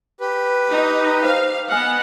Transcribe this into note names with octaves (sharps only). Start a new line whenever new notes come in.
G4 B4
D#4
C5 F5
B3 D#5 F#5 G#5 F6